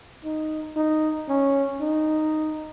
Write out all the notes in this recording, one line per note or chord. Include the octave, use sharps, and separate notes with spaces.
D#4
D#4
C#4
D#4